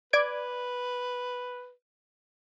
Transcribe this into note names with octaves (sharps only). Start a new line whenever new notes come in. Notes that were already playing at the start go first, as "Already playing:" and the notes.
B4 D5 G#6 D7